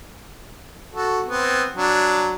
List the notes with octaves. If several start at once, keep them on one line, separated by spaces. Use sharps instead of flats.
F#4 A4
B3 C4
F#3 D4